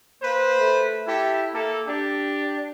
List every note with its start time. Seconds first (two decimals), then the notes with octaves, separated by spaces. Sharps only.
0.22 A#3 B4 C5
0.58 A3
1.07 E4 G4 A4 E5
1.54 A#3 A4
1.88 D4 G4